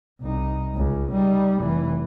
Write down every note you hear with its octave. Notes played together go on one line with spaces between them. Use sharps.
C2 D#4
C#2
G3 D#4
F1 E3